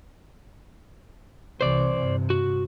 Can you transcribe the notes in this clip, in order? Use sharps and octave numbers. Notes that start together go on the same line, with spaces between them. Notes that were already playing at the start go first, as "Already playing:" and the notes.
C2 C3 E3 C5 D5
G2 C3
F#4